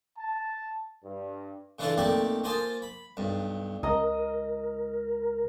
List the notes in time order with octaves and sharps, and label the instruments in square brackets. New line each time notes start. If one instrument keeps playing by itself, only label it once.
[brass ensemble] A5
G2
[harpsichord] C#3 E3 D4 E4 F4 A4
B1 A3 A#3 C4 G4 D5
A#3 F4 C5 G#5 A5 D#6
B5
B1 G2
[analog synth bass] C#2 [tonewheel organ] A#4 [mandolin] D#5 A#5